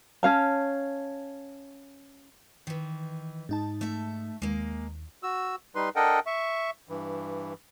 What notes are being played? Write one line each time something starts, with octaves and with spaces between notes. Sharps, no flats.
C#4 F5 A5
D#3 E3
G#2 D#4 A5
A3 E5
D#2 G#3 A#3
F#4 E6
G3 D#4 B4 C6
D4 A4 A#4 D#5 F#5 G5
E5 C#6
G2 E3